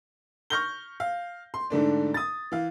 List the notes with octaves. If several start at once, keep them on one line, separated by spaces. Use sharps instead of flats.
C#6 F6 G6 A#6 G7
F5
C6
G#2 D3 A3 D4
D#6 A6
E3 F5